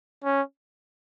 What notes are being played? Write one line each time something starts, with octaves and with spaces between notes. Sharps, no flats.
C#4